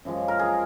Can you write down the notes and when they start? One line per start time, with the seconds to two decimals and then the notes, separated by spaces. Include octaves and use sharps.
0.05 F#2 F3 G#3
0.28 A#4
0.39 G#4